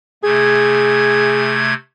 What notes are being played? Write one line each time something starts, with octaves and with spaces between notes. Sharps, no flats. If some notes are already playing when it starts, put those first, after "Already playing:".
C3 A3 G#4 G#6